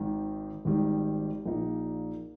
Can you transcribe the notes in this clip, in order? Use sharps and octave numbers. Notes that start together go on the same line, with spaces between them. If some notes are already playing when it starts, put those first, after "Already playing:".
Already playing: G#1 G#2 D#3
G#1 G#2 D#3 G3
A#1 A#2 A#3 D#4